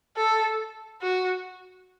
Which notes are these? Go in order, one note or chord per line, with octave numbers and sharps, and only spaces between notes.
A4
F#4